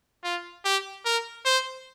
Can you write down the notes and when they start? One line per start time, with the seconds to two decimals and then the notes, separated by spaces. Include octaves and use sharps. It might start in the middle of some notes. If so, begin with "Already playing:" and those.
0.24 F4
0.64 G4
1.05 A#4
1.45 C5